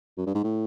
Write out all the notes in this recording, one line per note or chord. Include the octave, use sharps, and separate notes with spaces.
F#2
G2
G#2
A2